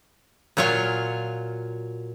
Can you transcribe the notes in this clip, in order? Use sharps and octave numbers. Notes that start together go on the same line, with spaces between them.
A#2 F#3 F4 C#5 F5